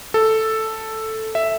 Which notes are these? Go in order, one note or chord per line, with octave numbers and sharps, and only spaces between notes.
A4
E5